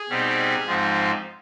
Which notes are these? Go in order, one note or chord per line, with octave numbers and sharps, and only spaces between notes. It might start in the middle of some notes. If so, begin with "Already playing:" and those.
Already playing: G#4
B2 G3 C4 D#4
G#2 F3 C4 D#4